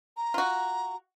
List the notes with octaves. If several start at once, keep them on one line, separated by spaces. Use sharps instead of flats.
A#5
F4 F#4